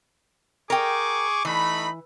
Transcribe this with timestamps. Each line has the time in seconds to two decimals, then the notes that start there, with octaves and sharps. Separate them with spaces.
0.70 G#4 A#4 G5 C#6 D6
1.45 E3 A3 D#4 B5